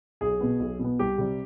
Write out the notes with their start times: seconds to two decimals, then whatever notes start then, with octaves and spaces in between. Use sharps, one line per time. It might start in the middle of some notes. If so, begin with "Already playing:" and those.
0.21 B1 G#4
0.41 B2 B3
0.60 B1
0.79 B2
0.84 B3
0.99 C2 G4
1.18 C3 G3